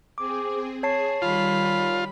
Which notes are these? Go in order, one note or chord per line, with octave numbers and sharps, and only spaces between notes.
C4 G#4 D6
G#4 C#5 A5 C7
D#3 G3 F4 B5